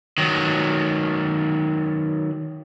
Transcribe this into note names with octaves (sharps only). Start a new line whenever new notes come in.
D#3 F#3